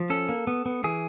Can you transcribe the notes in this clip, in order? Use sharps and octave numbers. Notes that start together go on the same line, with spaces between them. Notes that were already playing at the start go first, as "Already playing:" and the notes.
Already playing: F3
C#4 A4
A#3
B3
B3
E3 G#4